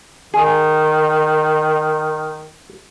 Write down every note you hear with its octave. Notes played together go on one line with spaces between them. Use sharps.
D#3 G#4